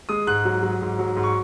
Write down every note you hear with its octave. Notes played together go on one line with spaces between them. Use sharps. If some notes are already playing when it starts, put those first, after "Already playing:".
G#3 D#6
G#2 F#6
F#3
F#3
G#2
F#3
G#2
C#6